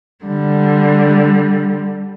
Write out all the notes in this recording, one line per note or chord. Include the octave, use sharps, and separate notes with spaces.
D3 G3